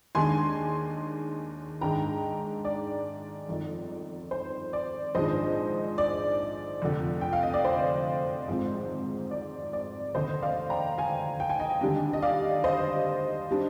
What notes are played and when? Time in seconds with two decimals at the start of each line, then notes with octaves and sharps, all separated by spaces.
0.15 D#2 D#3 G#3 D4 G#5 C6
1.81 G#2 D#3 G#3 D4 G5 A#5
2.65 D5
3.48 G1 F2 D#3
4.31 C5
4.73 D5
5.15 A#1 G#2 D#3 G#3 D4 C5 D#5
5.98 D5
6.82 F1 F2 D3
7.21 G5
7.33 F5
7.43 D#5
7.54 D5
7.65 C5
8.48 G#1 G#2 F3 C4
9.31 D5
9.73 D5
10.14 F1 D#2 D3 C5 D#5
10.42 D5 F5
10.70 G5 A#5
10.98 F5 G#5
11.40 G5
11.50 G#5
11.60 D#5 G5
11.81 D#2 D3 G3 D4
12.13 D#5
12.22 D5 F5
12.64 C5 D#5
13.51 G3 D4